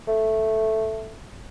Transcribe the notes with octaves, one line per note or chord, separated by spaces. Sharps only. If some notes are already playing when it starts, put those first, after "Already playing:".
A3